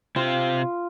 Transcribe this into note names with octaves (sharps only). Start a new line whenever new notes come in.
C3 C4 F4